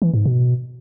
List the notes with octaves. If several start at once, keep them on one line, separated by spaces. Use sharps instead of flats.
E3
G#2
B2